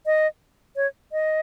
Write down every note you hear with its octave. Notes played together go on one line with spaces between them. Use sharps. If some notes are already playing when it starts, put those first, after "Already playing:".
D#5
C#5
D#5